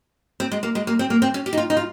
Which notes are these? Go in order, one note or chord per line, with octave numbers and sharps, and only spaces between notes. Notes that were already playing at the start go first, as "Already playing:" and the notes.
C4
G#3
A#3
G#3
A#3
C4
A#3
C4
C#4
G4
D#4
F4
D#4
F4